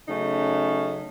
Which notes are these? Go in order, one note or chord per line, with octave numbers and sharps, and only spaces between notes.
C#3 F#3 A3 C#4 D#4